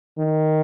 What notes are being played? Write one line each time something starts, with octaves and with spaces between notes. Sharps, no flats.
D#3